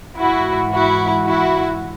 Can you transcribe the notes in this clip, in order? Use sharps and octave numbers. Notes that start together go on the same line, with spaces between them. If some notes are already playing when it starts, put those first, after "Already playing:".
G#2 E3 E4 F#4
E4 F#4
E4 F#4